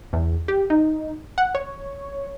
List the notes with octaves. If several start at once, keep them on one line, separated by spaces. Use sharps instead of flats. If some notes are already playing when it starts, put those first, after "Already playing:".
E2
G4
D#4
F#5
C#5